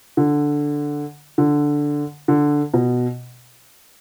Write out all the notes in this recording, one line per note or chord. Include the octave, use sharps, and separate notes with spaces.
D3
D3
D3
B2